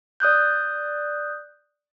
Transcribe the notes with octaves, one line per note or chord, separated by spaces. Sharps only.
D5 D#6 F#6 G6